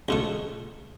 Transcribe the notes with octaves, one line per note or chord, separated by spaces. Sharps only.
C#2 B2 A3